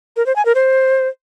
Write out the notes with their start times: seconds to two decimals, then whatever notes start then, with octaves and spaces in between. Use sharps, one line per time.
0.16 A#4
0.26 C5
0.36 G#5
0.45 A#4
0.55 C5